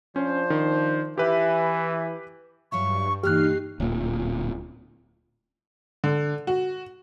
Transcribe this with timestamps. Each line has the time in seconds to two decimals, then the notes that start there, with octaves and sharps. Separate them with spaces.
0.16 F3 C#4 D4 C5
0.50 D#3
1.18 E3 G4 B4
2.72 G2 F#3 F4 E5 C#6
3.23 G2 A#2 E3 D#4 G4 F6 F#6 C7
3.80 D1 A#2
6.04 D3
6.47 F#4